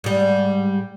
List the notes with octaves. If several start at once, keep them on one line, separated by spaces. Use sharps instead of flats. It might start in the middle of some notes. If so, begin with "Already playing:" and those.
G#2 G3